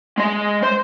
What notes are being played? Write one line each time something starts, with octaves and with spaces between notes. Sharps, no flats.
G#3 D#5
C5 C6